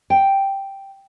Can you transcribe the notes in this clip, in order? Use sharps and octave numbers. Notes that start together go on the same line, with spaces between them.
G5